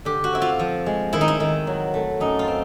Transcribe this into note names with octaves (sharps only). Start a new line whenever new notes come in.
D3 G4
F#4
C4 E4
F4
F3
G#3
D#3 E4
D#4
E4
D#3
F#3
A3
F#2 D#4
F4
C4